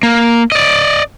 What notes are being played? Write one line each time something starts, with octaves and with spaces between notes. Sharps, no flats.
A#3
D5 D#5